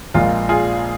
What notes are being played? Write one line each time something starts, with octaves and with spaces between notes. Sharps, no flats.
A#1 A#2 G#3 F4
F4 G#4